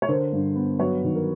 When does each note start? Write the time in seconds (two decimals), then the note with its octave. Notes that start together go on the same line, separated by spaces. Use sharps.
0.02 C#5
0.08 D3 A#4 C5
0.32 G2
0.56 B3
0.79 F#3 B4 C#5
1.04 D#3
1.15 A#4